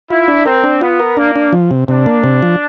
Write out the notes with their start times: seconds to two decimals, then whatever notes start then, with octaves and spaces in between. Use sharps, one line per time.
0.10 E4 F4
0.28 D4
0.46 C4 A#4
0.64 D4
0.81 B3 F4
1.00 A#4
1.17 A#3 D4
1.36 D4
1.53 F3
1.71 C3
1.88 C3 D4
2.06 A#3
2.24 C3
2.42 F3